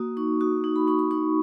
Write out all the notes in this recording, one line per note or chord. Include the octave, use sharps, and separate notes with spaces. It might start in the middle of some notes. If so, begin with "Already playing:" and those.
Already playing: A#3 F#4 D#6
D#4 C#6
F#4 D#6
D#4
B5
D#4 C#6
C#6
D#4 C#6